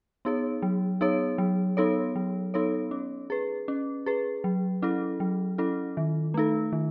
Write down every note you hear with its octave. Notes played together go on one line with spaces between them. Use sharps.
B3 D#4 G#4 C#5
F#3
B3 D#4 G#4 C#5
F#3
B3 D#4 A4 C#5
F#3
B3 D#4 A4 C#5
C#4
G#4 B4
C#4
G#4 B4
F#3
C#4 E4 A4
F#3
C#4 E4 A4
D#3
A3 D#4 A4
D#3